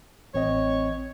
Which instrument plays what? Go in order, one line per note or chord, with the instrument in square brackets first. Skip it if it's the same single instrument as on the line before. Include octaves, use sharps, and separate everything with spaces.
[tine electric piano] A1 C4 D#5 [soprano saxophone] C#5